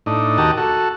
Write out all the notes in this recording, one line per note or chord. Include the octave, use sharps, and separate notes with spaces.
A2 D4 D#4
D#2 F#4 G4 A#4 D#5 A5
F#4 A4